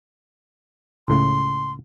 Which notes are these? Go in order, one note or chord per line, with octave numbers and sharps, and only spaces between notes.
C#2 A2 C#3 C6